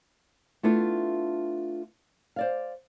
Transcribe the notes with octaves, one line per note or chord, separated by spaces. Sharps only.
A3 B3 D4 E4 F4 A4
C5 D5 F5